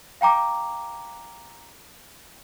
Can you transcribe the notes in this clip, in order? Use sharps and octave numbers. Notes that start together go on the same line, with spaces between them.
F5 G5 A#5 D6